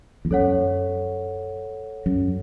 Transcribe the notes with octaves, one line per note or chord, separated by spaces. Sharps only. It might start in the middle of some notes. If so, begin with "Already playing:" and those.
E2
F#2 A4 C#5 F#5
F#2